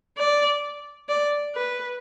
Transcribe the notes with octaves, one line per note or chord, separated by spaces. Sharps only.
D5
D5
B4